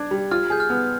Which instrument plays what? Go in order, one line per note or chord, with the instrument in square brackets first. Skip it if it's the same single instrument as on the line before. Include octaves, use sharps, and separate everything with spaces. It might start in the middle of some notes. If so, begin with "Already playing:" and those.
Already playing: [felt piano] D4 [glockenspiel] G#6
[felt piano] G3
[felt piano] F4 [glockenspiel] F6
[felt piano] G#4 [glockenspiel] G6
[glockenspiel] F6
[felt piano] B3